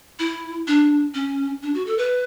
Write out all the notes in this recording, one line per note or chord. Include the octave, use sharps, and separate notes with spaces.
E4
D4
C#4
D4
F#4
A4
B4